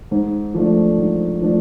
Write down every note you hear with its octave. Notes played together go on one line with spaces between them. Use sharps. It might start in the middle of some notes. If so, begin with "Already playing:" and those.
G#2
F3 A3 D4
G#2
F3 A3 D4